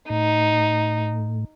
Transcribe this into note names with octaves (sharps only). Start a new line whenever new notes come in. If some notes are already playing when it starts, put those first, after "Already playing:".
A2 D#4